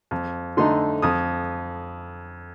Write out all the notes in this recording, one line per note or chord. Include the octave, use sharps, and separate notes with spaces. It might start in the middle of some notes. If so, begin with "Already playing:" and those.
F2
D3 A3 D#4 C6
F2 D#6